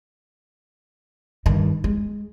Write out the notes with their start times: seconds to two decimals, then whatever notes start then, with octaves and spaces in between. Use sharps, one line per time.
1.46 G2 D#3
1.84 G#3